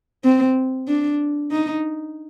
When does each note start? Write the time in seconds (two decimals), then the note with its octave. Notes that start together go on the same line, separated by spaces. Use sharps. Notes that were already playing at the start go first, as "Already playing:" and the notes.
0.24 C4
0.88 D4
1.52 D#4